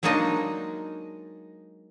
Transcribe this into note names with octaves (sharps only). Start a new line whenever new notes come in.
F#3 G#3 A#3 D4 D#4 D#5